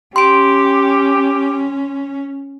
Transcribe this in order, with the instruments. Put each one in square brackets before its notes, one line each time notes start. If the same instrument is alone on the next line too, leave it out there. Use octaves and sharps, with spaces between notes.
[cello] C#4 [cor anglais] G4 [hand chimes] C6 D7